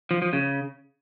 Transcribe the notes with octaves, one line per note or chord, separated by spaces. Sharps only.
F3
F3
C#3